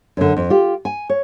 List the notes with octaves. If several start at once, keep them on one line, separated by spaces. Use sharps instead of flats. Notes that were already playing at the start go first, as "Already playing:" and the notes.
F#2 D3
F2
F4 G4
G#5
C#5